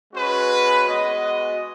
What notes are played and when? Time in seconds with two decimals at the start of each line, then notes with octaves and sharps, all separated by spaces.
0.13 G#3 C#4 F#4 B4
0.86 G#3 B3 F#4 D#5